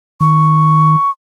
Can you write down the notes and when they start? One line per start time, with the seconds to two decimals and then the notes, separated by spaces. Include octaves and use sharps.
0.21 D#3 C#6